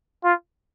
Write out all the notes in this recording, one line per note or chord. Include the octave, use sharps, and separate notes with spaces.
F4